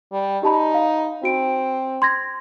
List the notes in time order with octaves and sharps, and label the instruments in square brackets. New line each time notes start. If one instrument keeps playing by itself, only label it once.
[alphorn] G3
[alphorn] D#4 [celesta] G4 A5 B5
[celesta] F5
[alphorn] C4 [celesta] F#4 D7
[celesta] C6 G#6 A#6